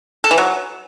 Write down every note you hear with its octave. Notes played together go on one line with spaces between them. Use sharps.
A4
E3
F#3